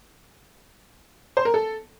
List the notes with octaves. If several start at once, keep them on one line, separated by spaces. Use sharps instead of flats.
C5
A#4
A4